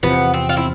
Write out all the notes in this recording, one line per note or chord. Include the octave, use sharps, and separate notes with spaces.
E2 C3 F3 B3
C4
F4
E4